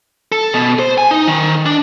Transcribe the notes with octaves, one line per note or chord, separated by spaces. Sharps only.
A4
B2
C5
G#5
D#4
D#3
D4